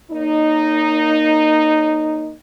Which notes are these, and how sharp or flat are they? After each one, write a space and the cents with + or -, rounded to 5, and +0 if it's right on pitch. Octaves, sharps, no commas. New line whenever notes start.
A#3 +0 D#4 -10 C#5 +20